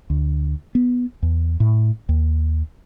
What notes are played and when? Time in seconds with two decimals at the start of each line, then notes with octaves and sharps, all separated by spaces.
0.10 D2
0.75 B3
1.22 E2
1.60 A2
2.09 D#2